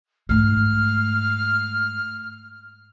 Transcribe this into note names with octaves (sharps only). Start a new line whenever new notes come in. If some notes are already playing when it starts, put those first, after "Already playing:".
G#2 A3 F6